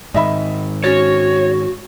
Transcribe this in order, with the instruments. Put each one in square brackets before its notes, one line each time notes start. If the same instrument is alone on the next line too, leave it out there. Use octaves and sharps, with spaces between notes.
[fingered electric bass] G#2 D#3 [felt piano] D#5 E5 B5
[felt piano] C#4 A6 [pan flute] F#4 [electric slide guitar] C#5